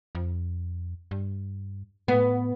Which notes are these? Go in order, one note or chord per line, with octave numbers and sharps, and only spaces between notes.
F2
G2
A2 B3